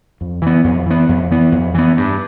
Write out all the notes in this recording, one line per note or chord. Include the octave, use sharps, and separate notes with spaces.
F2
E3 B3
F2
E3 B3
F2
E3 B3
F2
E3 B3
G2